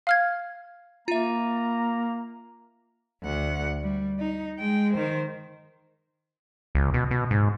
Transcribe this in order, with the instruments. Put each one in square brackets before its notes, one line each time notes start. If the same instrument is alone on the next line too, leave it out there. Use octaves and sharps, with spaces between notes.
[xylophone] F5 F6 G#6
[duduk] A#3 [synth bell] F4 E5 [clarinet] A#5
[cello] D2 F#5
G3
D#4
G#3 G5
D#3 C5
[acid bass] C#2
B2
B2
G#2